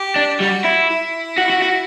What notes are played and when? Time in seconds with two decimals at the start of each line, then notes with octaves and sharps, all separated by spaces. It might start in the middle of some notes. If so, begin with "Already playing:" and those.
Already playing: G4
0.16 D4
0.40 G3 F#4
0.65 E4
0.89 E4
1.38 F#4
1.50 F#4
1.62 F#4